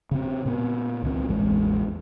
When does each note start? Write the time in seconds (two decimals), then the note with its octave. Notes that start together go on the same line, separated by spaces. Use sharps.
0.11 C#3 C4
0.45 A#2 B3
1.03 C#2 D#3 C4
1.29 A1 E2 G#3